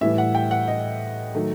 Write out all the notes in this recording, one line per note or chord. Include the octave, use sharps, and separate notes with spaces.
A2 E3 G3 E5
F#5
G5
F#5
D#5
D#3 F#3 A3